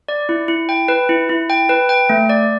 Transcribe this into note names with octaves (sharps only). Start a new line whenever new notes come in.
D5
E4
E4
G5
B4
E4
E4
G5
B4
G5
A3
D5